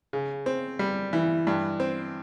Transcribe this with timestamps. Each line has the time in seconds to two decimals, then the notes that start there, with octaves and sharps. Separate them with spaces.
0.13 C#3
0.46 C4
0.79 G3
1.13 E3
1.47 G2
1.80 C4